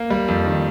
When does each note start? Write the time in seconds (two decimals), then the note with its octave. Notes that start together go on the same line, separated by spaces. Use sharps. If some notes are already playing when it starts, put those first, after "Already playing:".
Already playing: A#3
0.10 G3
0.28 F2
0.46 D#3